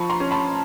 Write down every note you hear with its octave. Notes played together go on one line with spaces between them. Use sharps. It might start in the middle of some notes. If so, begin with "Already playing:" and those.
Already playing: F3 B5 C#6
A#5 C6
C#4
A5 B5